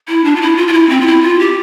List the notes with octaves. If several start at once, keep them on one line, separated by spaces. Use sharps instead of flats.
E4
D4
F4
E4
F4
F4
E4
C4
F4
E4
F4
G4